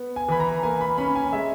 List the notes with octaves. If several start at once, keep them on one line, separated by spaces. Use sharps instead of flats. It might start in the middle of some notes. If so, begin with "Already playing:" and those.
Already playing: B3
G#5
E3 B5
A#5
A#3 G#5
B5
C#4 B5
G#5
G#3 E5